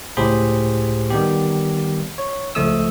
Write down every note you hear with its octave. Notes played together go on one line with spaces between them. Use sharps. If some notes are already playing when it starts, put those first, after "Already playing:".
C#2 A2 G4 G#4 C5 B5
D#3 G3 B3 G4
C#5
C#2 F3 A3 D#6 E6